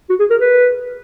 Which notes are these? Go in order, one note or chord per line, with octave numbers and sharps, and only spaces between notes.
F#4
G#4
A#4
B4